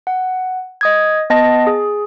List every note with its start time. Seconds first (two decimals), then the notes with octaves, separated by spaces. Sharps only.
0.07 F#5
0.81 D#5 D#6 G#6
1.30 B3 D#5 A5 A#6
1.67 G#4